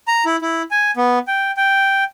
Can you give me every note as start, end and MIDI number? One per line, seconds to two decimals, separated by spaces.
0.08 0.24 82
0.26 0.36 64
0.42 0.62 64
0.71 0.91 80
0.97 1.19 59
1.28 1.51 79
1.57 2.04 79